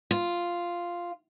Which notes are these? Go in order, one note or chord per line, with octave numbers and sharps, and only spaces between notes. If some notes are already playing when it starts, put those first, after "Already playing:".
F4